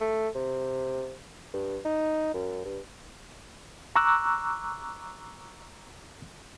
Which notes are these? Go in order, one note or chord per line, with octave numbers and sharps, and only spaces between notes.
A3
C3
G2
D#4
F#2
G2
A#5 C#6 D6 E6 F#6